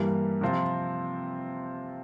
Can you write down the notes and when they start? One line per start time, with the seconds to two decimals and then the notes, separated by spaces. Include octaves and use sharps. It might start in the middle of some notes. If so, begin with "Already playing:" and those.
Already playing: G2 E3 G3 A#3
0.41 C3 F3 C4 F4